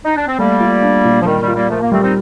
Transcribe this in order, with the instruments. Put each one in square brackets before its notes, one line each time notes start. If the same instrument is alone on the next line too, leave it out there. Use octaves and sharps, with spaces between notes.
[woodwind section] D#4
D4
C4
[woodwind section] G3 A#3 [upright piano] A3
[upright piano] F4
D4
A#2
[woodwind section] F3
[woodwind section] D#3 G3 [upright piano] A#4
[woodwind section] D#3 G3
[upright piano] F4
[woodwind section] G3 A#3
[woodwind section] F3 A3 [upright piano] A#4
[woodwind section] A#3
[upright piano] G3 [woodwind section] A3 C4
[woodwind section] C4 D#4